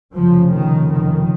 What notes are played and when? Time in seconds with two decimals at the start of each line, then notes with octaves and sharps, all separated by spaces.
0.14 F1 F2 C#3 F3
0.52 D#3
0.90 D#3